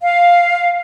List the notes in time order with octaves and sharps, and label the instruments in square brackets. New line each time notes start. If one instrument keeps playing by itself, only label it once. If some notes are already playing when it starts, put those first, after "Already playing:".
[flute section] F5